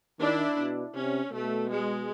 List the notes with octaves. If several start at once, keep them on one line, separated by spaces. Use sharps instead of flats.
D#3 D4 E4
B2
C3 C#4
B2 A3
G#3